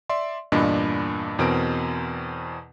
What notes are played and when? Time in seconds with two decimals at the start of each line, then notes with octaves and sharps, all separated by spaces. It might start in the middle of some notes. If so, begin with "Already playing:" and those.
0.09 D5 E5 C6
0.52 E2 G2 A#2 D4 D#5 B5
1.39 E2 B2 C4 A#4 D7